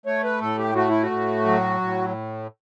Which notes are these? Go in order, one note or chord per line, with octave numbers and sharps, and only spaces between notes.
A3 C#5
B4
A2 A4
G4
A3 F#4
E4
F#4
A2
F#3
A2